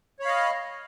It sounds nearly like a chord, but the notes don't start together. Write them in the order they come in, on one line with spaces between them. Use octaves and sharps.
C#5 B5 F5 D#5